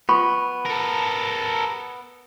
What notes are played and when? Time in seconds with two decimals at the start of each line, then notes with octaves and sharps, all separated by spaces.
0.09 B3 F4 B5 C#6
0.65 A4 A#4